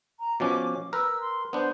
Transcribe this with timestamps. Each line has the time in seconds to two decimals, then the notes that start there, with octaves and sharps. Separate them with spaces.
0.20 A#5
0.40 B2 F3 C#4 D6
0.93 A#4 B4 E6
1.21 C6
1.53 B3 D4 C5